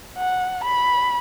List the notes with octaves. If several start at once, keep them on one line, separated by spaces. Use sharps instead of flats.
F#5
B5